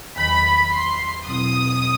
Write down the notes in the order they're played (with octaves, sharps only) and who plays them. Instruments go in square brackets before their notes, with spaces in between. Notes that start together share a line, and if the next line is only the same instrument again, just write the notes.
[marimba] E2 D#3 F#3 [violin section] B5
[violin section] C6
[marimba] B2 F#3 C4 E4 [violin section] D#6